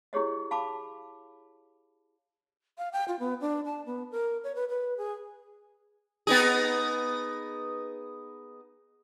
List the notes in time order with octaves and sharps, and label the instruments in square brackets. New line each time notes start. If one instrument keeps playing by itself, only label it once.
[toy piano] E4 G4 G#4 C#5 D#5
F5 A5 B5 D6
[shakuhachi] F5
G5
F4
B3
D4
A5
B3
A#4
C#5
B4
B4
G#4
[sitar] B3 D#4 G#4